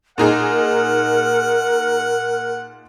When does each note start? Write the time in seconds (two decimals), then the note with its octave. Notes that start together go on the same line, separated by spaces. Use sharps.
0.18 A#2 D#4 G#4 A#4 F#5